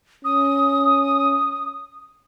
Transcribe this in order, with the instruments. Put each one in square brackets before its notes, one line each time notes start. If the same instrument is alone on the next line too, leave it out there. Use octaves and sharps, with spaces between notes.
[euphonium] C#4 [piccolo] D#6